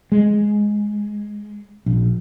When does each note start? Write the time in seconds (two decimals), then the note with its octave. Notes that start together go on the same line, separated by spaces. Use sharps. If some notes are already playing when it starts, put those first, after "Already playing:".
0.12 G#3
1.86 A#1